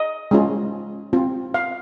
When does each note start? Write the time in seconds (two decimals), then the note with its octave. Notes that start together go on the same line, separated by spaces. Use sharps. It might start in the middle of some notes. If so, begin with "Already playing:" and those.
Already playing: D#5
0.31 G#3 C#4 F4
1.13 C4 F4
1.54 F5